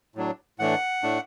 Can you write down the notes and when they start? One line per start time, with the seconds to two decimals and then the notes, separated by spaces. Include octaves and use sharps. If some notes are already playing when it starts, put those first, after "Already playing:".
0.15 A2 F#3 D4
0.59 A2 E3 A3 D4 F#5
1.03 A2 A3 D4